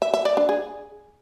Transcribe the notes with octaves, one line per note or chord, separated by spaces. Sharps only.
E5
E5
D5
D4
G#4